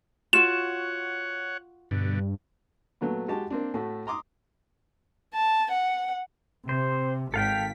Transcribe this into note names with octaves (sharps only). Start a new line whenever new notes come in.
F4 F#4 C#5 F#5 E7
G2 B2 D3
A#2 F#3 A3 B3
G#3 F#4 G4 A5
A#3 C4 D4
A2 A3 F#4
A#5 C6 D6 D#6
A5
F#5
C3 C5
G#1 A4 F5 G5 B6